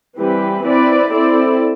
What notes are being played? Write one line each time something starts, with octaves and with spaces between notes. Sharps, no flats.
E3 G3 C4 G4 B4
C4 E4 B4 D5
C4 E4 A4 D5